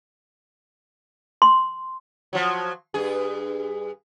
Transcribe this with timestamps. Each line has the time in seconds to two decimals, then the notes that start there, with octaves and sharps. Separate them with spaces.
1.42 C6
2.33 F3 F#3
2.94 G2 G#4